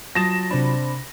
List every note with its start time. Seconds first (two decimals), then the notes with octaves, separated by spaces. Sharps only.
0.15 F#3 F4 A5 D#6 A6 A#6 E7
0.51 C3 C4 D4 B5